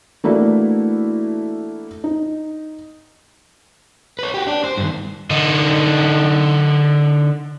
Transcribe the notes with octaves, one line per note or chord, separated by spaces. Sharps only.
E3 A3 A#3 D4 E4 F#4
D#4
B4 C#5
F#4 G4
D4 D5
C5
G2 D#3
D3 D#4